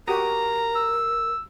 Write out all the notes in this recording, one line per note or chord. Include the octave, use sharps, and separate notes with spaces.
F#4 G4 A#4 A#5 D#6
E6